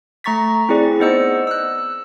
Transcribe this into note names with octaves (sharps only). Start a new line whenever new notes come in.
A3 A#5 C#6 A6 B6
C4 E4 G#4 D5
B3 D#4 C5 D#5 E6 C#7
E6 F#6